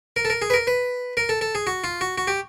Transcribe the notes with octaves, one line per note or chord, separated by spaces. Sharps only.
A#4
A4
A#4
G#4
B4
A#4
B4
A#4
A4
A4
G#4
F#4
F4
F#4
F#4
G4